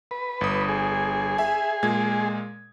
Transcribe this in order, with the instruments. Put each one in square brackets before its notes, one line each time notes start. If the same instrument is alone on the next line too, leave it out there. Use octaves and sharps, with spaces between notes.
[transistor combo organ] B4
[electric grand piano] G1 D#6
[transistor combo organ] G#4
[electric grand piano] E5 G#5
A#2 G#3 G#6